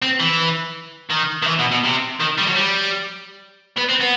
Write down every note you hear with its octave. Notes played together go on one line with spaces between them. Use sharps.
C4
E3
D#3
D#3
E3
B2
B2
C3
D#3
G3
F#3
G3
B3
C4
B3